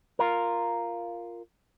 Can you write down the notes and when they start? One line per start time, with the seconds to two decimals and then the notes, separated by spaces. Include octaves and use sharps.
0.19 F4 A#4